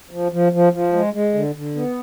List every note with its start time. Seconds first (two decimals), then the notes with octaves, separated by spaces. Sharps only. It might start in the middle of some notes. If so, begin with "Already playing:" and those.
0.11 F3
0.32 F3
0.52 F3
0.73 F3
0.93 G#3
1.13 G#3
1.34 D3
1.55 D3
1.75 B3